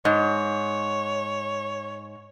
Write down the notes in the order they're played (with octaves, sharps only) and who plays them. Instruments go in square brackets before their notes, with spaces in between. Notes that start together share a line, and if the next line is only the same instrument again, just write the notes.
[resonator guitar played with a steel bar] G#2 [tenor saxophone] C#5